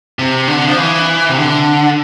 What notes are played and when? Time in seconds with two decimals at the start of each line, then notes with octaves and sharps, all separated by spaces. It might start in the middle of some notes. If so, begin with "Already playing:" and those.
0.19 C3
0.48 D3
0.68 F3
0.77 E3
1.29 C3
1.37 D3